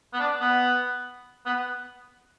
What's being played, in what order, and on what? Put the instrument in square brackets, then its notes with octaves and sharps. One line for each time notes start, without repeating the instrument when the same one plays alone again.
[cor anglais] B3
D4
B3
B3